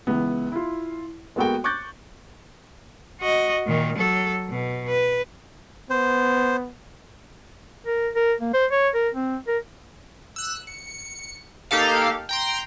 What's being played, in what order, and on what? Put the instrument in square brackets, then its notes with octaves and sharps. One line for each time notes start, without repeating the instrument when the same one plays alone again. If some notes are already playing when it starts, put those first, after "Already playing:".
[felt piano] C#2 E3 B3
E4 F4
G#3 A#3 B3 F#4 A4 G5
C#6 D6 F#6 G6 A6
[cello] F#4 D#5
A#2 D#3
F#3 A4
B2
B4
[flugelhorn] B3 [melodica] C5
[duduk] A#4
A#4
A#3
C5
C#5
A#4
C4
A#4
[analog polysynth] E6 F#6
C#7
A#3 D#4 G4 A4 F5
G5 A#5 C6